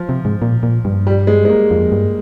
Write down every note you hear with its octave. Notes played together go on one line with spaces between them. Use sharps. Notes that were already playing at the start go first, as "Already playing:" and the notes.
Already playing: F3
C3
G#2
A#2
A#2
G2
G3
G#3
G#3
A#3
F2
G2